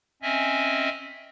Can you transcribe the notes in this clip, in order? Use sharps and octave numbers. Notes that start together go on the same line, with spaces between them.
C4 C#4 D#5 E5 G#5